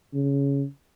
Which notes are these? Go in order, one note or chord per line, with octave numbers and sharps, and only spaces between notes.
C#3